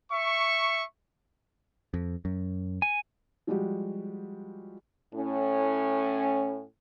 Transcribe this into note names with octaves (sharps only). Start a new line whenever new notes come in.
E5 C#6
F2
F#2
G#5
F3 G3 G#3 F#4 G4
A2 C#4